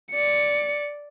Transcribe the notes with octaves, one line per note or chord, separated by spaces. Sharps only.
D5 C#7